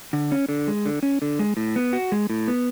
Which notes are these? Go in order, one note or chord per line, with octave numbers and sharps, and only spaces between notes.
D3
C#4
D3
G#3
D3
C#4
D3
G#3
A2
B3
F#4
G#3
A2
B3